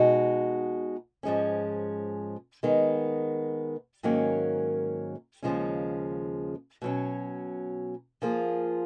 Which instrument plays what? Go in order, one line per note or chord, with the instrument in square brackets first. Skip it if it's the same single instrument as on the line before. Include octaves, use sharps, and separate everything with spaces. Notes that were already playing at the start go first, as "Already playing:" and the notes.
Already playing: [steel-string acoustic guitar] B2 G#3 D#4 F#4
G#2 F3 G#3 C#4
D#3 G#3 B3
G#2 D#3 F#3 A#3 C#4
D#2 C#3 F3 G#3 C#4
B2 F#3 C#4
F3 A#3 F4 G#4